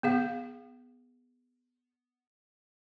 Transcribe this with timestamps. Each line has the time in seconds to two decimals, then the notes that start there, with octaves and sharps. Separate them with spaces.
0.03 B3 G#4 F5